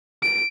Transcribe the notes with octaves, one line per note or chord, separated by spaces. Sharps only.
D7